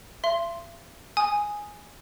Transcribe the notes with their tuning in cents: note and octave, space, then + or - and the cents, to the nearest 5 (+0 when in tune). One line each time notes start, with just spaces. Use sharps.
E5 +45 C6 +0
G#5 +0 D#6 +0